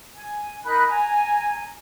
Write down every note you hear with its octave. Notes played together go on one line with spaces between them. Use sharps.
G#5
D#4 A#4 B5 F#6
G#5 A#5